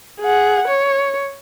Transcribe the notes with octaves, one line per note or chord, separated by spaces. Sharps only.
G#4 F#5
C#5